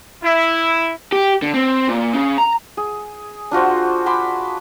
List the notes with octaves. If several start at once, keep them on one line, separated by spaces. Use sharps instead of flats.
E4
G4
D3
C4
A#2
C#3
A#5
G#4
D4 F4 F#4 C5
G#5 B5 C6 D6